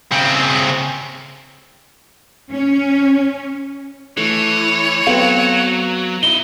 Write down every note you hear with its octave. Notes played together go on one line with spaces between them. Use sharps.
C#3 C4
C#4
E3 A3 C#5
F#3 B3 C4 A4 F5
D#4 E4 G7